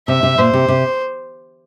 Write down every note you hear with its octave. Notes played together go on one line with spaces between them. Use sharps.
C3 E5
C3
A#2 C5
C3
C3